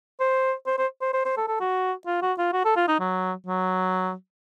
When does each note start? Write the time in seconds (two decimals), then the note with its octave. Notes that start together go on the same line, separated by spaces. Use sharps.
0.20 C5
0.67 C5
0.78 C5
1.01 C5
1.13 C5
1.25 C5
1.37 A4
1.48 A4
1.60 F#4
2.06 F4
2.22 F#4
2.38 F4
2.53 F#4
2.65 A4
2.76 F4
2.88 D#4
3.00 F#3
3.46 F#3